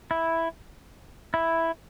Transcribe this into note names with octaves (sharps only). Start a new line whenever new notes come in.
E4
E4